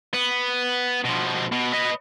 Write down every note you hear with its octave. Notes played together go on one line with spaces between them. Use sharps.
B3
B2 F3
B2
B4 D#5